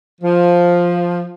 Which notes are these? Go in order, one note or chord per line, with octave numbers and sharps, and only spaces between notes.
F3